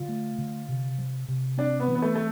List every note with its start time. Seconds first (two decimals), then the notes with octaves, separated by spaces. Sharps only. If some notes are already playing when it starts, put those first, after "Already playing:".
Already playing: D3 F4
0.08 A3
0.38 D3
0.69 C3
0.98 F3
1.28 C3
1.58 C4 D4
1.80 B3
1.88 E3
1.95 B3
2.02 A3
2.15 A3